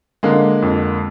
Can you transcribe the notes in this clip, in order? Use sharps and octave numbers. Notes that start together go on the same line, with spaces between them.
D3 G#3 A#3
F2